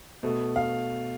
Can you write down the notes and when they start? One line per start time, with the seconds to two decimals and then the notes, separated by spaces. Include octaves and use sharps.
0.23 B2 A3
0.56 F5